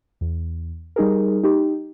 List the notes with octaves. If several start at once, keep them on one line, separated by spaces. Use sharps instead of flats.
E2
G3 D#4 G#4 A#4
D#4 G4